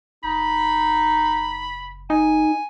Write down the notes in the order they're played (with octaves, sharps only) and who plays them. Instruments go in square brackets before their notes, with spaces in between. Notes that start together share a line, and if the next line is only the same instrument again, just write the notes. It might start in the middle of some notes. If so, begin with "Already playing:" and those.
[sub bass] F#1 [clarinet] D#4 [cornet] B5
[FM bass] D#4 [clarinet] G#5